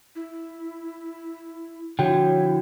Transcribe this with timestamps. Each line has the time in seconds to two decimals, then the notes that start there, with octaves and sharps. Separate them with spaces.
0.15 E4
1.99 D3 F3 E4 F#4 C#5 G5